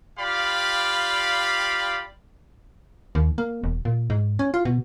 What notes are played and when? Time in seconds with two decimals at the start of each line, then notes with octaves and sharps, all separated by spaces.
0.19 F4 G4 D5 F5 B5
3.15 D#2
3.38 A#3
3.64 E1
3.85 A#2
4.10 G#2
4.39 C#4
4.54 F4
4.65 B2